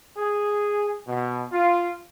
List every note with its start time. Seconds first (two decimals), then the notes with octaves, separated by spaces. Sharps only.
0.17 G#4
1.08 B2
1.52 F4